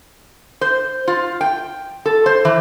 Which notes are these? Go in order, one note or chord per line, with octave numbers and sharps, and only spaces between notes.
C5
F4
G5
A4
C5
E3